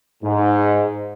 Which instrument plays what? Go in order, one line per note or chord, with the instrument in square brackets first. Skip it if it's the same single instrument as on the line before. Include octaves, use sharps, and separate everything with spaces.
[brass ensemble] G#2